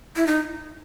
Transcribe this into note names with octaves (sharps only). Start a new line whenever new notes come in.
E4
D#4